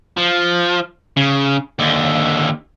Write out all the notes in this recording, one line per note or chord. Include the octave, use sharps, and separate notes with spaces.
F3
C#3
D#2 D3